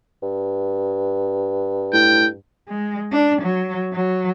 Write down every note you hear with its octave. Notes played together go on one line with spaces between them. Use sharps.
G2
A2 G5
G#3
D4
F#3
F#3